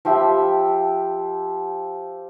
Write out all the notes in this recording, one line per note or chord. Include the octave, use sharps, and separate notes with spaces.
F3 G4 E5 B5